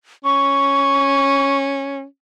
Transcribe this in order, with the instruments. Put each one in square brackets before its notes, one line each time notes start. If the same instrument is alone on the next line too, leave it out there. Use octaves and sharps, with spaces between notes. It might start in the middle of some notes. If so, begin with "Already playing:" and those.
[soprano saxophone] C#4 [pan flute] C#6